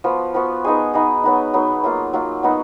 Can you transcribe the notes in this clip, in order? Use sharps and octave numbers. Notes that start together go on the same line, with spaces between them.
F3 B3 F#4
F3 B3 F#4
B3 D#4 G#4 D#5
B3 D#4 G#4 D#5
F#3 B3 D#4
F#3 B3 D#4
F#3 A#3 F4
F#3 A#3 F4
F#3 B3 D#4 F#4